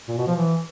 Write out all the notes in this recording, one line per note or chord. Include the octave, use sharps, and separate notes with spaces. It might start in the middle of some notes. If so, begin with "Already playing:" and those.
A#2
B2
F3
E3